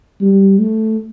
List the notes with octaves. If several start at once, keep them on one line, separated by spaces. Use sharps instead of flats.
G3
A3